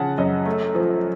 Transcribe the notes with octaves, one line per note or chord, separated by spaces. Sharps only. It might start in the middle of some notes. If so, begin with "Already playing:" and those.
Already playing: C#3 F3 F#5 A5
F#2 D#5
A3
F3